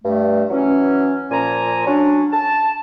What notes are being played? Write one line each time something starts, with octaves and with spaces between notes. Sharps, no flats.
G2 A3
E3 F#3 C#4
A#2 F3 G#5 A#5
F#3 C#4 D4
A5